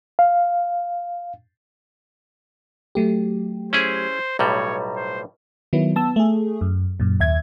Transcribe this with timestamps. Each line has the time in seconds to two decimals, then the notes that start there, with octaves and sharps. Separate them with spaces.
0.19 F5
2.95 F#3 A3 G4
3.73 C#4 E4 G#4 C5
4.39 B1 A2 G3 C#5 A#5
4.96 C5
5.73 D#3 F#3 B3 E4
5.96 B3 A5 E6
6.16 A3 G#4
6.61 F#2
7.00 F#2 A#2
7.20 D#2 E5 G#6